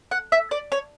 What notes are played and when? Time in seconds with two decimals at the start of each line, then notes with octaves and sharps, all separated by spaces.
0.11 F#5
0.32 E5
0.51 D5
0.72 C#5